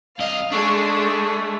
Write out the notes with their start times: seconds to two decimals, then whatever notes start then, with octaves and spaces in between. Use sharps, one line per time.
0.19 C2 D#5 F5
0.52 G#3 A3 D4 C#6